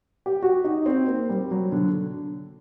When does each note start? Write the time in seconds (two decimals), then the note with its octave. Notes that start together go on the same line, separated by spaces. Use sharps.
0.26 G4
0.42 F#4
0.64 D#4
0.86 C4
1.07 A#3
1.29 G3
1.51 F#3
1.72 D3